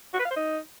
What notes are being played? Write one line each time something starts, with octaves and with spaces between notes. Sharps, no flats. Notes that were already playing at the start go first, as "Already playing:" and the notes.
F#4
B4
F5
C5
D#4